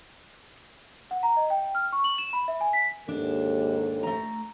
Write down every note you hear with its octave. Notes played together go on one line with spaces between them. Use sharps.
F#5
A#5
D#5
G5
F6
C#6
F#7
E7
B5
E5
G#5
B6
D#2 G#2 D4 A4
A3 A#5